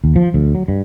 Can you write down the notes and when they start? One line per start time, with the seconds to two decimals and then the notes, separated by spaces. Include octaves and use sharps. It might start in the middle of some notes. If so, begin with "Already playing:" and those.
0.04 D#2
0.16 F3
0.34 D2
0.55 F#3
0.68 G2